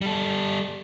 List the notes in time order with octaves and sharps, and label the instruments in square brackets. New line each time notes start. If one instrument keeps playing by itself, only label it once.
[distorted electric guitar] G3 A4